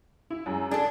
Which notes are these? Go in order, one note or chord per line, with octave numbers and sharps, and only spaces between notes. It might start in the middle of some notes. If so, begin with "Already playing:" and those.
E4
F#2 G#3
D4 G#4 A4